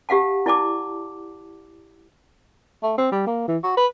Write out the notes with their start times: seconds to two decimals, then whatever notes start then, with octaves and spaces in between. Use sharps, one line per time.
0.09 G4 F5 F#5 A5
0.46 E4 D5 A5 D6
2.83 A3
2.98 C4
3.12 G3
3.27 A#3
3.48 E3
3.63 F#4
3.77 B4